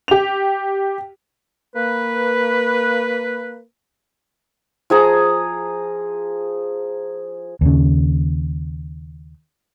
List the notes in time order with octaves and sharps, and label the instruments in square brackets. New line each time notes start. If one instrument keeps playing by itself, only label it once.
[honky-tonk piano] G4 F7
[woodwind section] A#3 B4
[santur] F3 G#4 A#5
[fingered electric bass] D#2 C#3